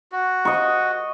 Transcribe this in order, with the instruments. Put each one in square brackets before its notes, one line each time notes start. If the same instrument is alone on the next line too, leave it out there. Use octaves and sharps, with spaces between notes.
[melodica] F#4
[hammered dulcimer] D#5 C#6